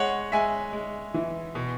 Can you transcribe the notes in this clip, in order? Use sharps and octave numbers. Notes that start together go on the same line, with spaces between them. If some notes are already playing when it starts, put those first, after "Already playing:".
Already playing: G#3 C#5 F#5
G#3 E5 G#5
G#3
E3
B2